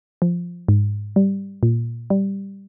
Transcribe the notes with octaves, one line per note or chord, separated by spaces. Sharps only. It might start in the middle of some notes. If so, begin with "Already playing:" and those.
F3
G#2
G3
A#2
G3